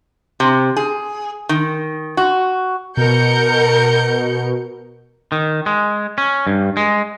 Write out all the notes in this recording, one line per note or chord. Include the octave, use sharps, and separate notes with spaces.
C3
G#4
D#3
F#4
B2 A#4 G6 C#7
D#3
G#3
C#4
G2
G#3